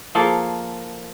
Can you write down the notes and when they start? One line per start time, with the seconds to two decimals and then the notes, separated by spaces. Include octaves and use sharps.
0.15 F3 A#3 G#4 A4